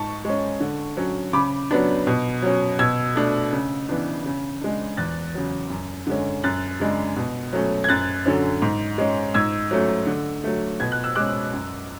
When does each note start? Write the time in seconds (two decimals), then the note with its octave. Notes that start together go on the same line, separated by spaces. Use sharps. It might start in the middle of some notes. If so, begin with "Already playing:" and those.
Already playing: G#2 A5 C#6
0.25 G#3 C#4
0.60 D3
0.97 F#3 C#4
1.33 C#3 B5 D6
1.71 F#3 B3 D4
2.07 B2
2.42 F#3 C#4
2.79 B2 E6 G#6
3.15 A3 D4
3.53 C#3
3.89 E3 B3 D4
4.26 C#3
4.61 G#3 D4
4.97 E2 F#6 A6
5.34 C#3 F#3
5.70 F#2
6.07 D3 G#3 C#4
6.44 F#2 F#6 A6
6.80 C#3 G#3 D4
7.17 B2
7.53 F#3 A3 C#4
7.84 G#6
7.89 F#2 F#6 A6
8.26 D3 F#3 C#4
8.62 G#2
8.98 G#3 C#4
9.34 G#2 E6 G#6
9.71 F#3 A3 C#4
10.07 D3
10.44 F#3 A3
10.80 B2 G#6
10.92 F#6
11.04 E6
11.15 G#3 C#4 D6 F#6
11.54 F#2